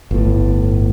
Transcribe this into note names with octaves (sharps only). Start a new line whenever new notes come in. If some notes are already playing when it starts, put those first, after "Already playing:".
G1 A2